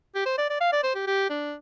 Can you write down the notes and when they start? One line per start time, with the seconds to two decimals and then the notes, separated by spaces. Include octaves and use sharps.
0.15 G4
0.26 C5
0.38 D5
0.50 D5
0.61 F5
0.73 D5
0.84 C5
0.95 G4
1.07 G4
1.30 D4